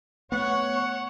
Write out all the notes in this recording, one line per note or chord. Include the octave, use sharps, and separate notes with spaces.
A3 B3 C#5 F#5 C#6